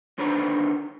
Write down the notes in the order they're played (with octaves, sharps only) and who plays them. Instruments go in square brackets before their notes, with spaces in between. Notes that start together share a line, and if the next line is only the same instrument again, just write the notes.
[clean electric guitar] C2 D3 D#3 B4 C5 A#5